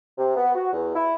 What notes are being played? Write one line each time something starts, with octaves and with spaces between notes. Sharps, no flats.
C3
B3
F#4
E2
E4